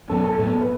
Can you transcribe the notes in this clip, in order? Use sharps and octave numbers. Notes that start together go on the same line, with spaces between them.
B2 F#3 C#4 A4
A4
A2 F#3 B3
A4
B4